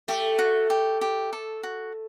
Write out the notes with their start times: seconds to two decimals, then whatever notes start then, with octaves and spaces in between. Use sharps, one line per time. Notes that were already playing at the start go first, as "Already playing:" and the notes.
0.08 A3 G4
0.39 F#4
0.70 G4
1.01 G4
1.33 A4
1.63 F#4